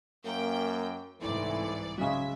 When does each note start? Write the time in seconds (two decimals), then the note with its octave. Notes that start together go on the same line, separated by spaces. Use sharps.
0.25 F#2 A#3 G5
1.20 C2 G#2 E3 A3 C4 E4 D5
1.98 C#3 F#3 G#3 E5